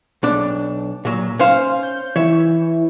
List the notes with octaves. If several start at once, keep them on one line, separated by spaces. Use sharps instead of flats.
B1 D4
A#2 F#3
C#4 C5 F5
G6
E3 C#5 E5